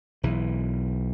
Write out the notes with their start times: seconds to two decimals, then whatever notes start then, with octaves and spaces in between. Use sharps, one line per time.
0.23 B1 E3